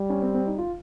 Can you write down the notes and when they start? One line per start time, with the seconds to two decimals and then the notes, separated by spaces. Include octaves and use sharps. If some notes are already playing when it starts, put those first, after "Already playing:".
Already playing: G3
0.10 C#4
0.22 C4
0.34 C4
0.46 D#4
0.58 F4